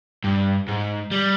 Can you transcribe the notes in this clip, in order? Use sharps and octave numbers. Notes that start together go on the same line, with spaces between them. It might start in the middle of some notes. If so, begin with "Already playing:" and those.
G2
G#2
G3